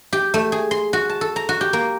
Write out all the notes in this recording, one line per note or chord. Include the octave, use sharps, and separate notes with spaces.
G4
A3
G#4
C6
F#4
A5
A4
A#5
F#4
G4
A#3